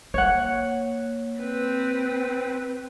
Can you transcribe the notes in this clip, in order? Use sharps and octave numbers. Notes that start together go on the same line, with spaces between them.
A#3 C#5 F#5
C4 B4